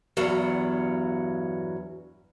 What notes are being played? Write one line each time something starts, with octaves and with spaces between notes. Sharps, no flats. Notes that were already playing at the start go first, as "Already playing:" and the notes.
E2 G2 F#3